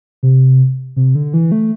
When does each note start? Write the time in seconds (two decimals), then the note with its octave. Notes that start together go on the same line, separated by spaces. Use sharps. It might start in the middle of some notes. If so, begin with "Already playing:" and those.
0.23 C3
0.96 C3
1.15 D3
1.34 E3
1.52 A3